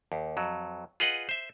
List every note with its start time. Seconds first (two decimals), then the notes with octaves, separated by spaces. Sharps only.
0.12 D#2
0.37 F2 F#3
1.00 F4 G#4 B4 D#5 F#5
1.29 C5 E5